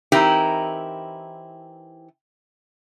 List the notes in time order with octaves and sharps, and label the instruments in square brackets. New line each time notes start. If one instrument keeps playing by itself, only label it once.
[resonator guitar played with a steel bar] E3 C4 D#4 E4 G4 A#4